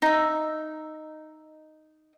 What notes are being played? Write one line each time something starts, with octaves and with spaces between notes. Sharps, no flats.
D#4 E5